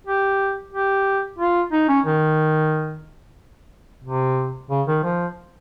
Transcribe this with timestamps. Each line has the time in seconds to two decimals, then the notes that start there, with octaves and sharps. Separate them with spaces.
0.07 G4
0.73 G4
1.39 F4
1.72 D#4
1.89 C#4
2.06 D#3
4.04 C3
4.70 C#3
4.87 D#3
5.03 F3